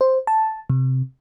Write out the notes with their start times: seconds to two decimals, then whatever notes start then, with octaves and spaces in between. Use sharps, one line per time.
0.01 C5
0.27 A5
0.70 C3